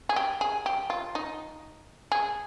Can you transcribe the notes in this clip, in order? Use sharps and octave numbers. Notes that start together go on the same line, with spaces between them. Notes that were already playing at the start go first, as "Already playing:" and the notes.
G#4
G4
G#4
G4
F4
D#4
G#4